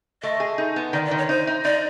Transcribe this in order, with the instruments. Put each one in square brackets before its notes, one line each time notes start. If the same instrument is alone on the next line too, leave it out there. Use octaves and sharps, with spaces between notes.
[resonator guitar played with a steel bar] A3 [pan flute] D#5
[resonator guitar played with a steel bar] G#4
D#4
B3
[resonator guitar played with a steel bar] D#3 [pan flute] D5
[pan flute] D5
[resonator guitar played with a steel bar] D#3
[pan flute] C#5
[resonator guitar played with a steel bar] D#4 [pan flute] C5
[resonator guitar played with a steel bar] D#4
[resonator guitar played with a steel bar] D#4 [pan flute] D5